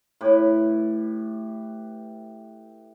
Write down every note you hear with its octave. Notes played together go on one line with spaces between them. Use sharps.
A2 G4 B4